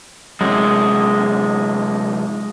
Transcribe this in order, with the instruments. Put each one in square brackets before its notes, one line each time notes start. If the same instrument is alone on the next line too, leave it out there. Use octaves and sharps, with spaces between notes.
[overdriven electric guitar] F#2 C3 [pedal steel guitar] G#3